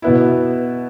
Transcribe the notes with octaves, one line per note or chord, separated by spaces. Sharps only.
B2 B3 E4